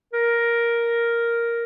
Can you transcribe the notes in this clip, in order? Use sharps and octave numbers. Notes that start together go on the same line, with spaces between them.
A#4